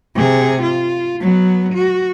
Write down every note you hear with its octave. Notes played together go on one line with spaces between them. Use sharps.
C3 G#4
F4
F#3 B3
F#4